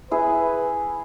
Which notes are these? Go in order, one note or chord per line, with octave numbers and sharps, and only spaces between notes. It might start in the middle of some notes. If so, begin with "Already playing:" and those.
E4 G#4 B4